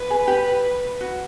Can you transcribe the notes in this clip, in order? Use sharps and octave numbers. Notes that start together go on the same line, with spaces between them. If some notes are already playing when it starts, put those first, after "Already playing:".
Already playing: B4
G#4
G4
F#4